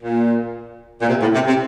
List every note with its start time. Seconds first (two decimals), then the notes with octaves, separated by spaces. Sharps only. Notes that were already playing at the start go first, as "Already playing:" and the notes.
0.02 A#2
1.02 A#2
1.08 C3
1.21 A2
1.34 C3
1.47 C3